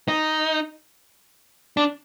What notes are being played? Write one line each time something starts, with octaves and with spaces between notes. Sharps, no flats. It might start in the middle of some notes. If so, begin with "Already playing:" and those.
D#4
D4